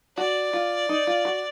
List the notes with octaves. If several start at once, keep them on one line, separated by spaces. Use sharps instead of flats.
F#4 D5
F4
D#4
F4
F#4